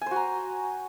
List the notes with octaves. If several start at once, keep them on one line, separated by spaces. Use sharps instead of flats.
F#4 C5 G#5 A#5